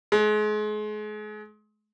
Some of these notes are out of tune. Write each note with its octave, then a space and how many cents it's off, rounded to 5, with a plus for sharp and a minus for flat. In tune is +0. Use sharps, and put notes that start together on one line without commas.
G#3 +35